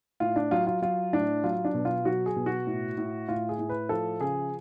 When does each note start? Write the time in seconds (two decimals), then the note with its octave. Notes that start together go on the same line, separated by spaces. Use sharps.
0.20 A2 F4
0.36 D4
0.51 F#3 F4
0.67 F4
0.82 F#3 F4
1.13 A2 D4
1.44 F#3 F4
1.65 D4
1.74 B2
1.85 F4
2.05 F#3 F#4
2.26 G#4
2.36 B2
2.46 F#4
2.67 A2
2.98 A2
3.28 A2 F4
3.49 G#4
3.59 A2
3.69 B4
3.89 F3 A4
4.21 C#3 G#4